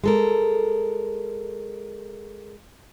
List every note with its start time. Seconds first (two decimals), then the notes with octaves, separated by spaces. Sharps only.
0.04 G#3 A4 A#4